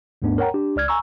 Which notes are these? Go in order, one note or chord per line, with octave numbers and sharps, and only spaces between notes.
D#2 G#2 A3 B3 D4
A#4 C#5 F#5 G5 A#5
D4 G4
C#2 D5 F6 G#6
G#5 A#5 C#6 E6